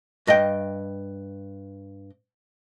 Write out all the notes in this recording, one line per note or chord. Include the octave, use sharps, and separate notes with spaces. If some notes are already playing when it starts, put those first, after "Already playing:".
G2 D#5 F5 G5